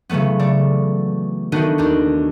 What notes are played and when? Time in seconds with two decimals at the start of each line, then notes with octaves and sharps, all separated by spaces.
0.09 C#3 E3 F#3 A3 B3
0.39 A3 D5
1.52 D#3 A3 B3 D4 D#4 F#4
1.78 D#2 D4 D#4